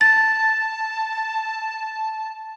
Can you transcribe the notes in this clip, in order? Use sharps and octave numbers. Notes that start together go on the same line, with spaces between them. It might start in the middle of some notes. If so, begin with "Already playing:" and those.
A5 A6